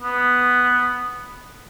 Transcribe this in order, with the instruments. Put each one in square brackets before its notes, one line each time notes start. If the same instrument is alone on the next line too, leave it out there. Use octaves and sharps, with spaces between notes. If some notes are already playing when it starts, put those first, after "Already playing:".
[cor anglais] B3